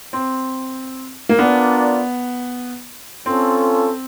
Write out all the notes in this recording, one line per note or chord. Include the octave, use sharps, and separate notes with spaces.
C4
A#3
B3 D4 F4 A#4 D5
C4 C#4 F4 A4